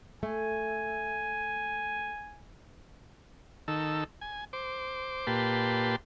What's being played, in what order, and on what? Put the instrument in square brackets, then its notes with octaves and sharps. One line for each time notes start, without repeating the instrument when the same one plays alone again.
[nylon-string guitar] A3 [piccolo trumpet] G#5
[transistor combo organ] D#3 A4 E6
G#5
C5 D6
A#2 G4 B4 A5 C6